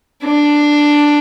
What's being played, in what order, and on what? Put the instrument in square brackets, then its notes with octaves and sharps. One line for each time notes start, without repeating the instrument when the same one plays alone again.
[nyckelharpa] D4